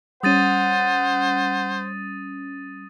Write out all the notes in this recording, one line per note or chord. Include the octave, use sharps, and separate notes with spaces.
G3 C#4 C5 F#5 D#6 A6 D#7